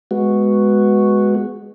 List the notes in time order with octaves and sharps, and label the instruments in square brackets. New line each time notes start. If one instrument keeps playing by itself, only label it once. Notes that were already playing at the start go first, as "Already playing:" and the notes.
[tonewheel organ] G#3 B3 F#4